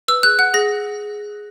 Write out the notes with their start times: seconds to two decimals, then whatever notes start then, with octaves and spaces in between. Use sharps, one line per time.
0.08 B4 E6
0.23 G#4 F#6
0.39 F#5 F#6
0.54 G#4 A#6